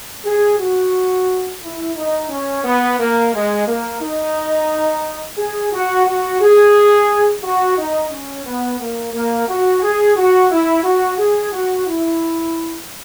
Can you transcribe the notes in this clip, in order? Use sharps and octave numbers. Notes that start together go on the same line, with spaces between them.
G#4
F#4
E4
D#4
C#4
B3
A#3
G#3
A#3
D#4
G#4
F#4
F#4
G#4
F#4
D#4
C#4
B3
A#3
A#3
F#4
G#4
F#4
E4
F#4
G#4
F#4
E4